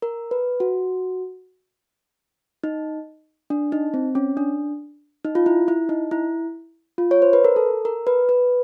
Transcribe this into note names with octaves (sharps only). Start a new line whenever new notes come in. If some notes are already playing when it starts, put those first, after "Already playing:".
A#4
B4
F#4
D#4
D4
D#4
C4
C#4
D4
D#4
F4
E4
E4
D#4
E4
F4
C#5
C5
B4
A#4
A4
A#4
B4
B4